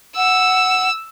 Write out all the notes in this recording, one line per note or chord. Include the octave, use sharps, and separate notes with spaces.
F#5 E6